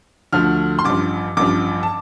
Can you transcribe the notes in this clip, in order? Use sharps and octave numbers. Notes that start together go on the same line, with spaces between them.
D2 D3 F3 A3 F6
C6
A1 G2 F3 D6
A1 G2 F3 D6
A5